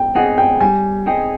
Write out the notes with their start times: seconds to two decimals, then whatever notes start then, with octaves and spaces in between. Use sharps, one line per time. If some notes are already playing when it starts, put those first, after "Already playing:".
Already playing: G5
0.15 C4 D#4 G#4 F#5
0.38 G5
0.60 G3 G#5
1.06 C4 D#4 G#4 G5